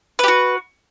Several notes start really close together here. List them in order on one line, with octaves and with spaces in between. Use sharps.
B4 G4 F#4